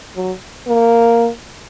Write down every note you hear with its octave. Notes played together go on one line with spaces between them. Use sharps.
F#3
A#3